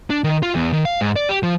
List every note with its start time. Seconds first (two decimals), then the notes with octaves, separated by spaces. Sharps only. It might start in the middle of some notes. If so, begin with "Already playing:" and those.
0.10 D4
0.24 D#3
0.43 F4
0.55 E2
0.73 D#3
0.85 F5
1.01 G#2
1.16 D5
1.29 G4
1.43 F3